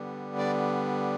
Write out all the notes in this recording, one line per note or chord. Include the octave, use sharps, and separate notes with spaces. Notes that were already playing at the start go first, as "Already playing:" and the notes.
Already playing: D3 G3 B3
D5